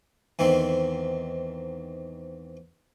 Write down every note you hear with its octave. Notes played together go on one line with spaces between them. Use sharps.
E2 G#2 D#3 C4